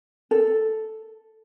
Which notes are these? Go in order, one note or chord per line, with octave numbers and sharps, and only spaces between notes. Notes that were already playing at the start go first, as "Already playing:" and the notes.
A4